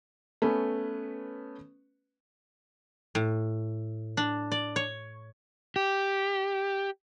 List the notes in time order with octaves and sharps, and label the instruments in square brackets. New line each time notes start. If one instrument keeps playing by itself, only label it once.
[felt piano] A3 B3 C#4 B4
[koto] A2
D4
D5
C#5
[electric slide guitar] G4